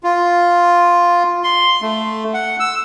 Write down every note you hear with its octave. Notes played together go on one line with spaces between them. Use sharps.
F4
C6
A3
F#5
E6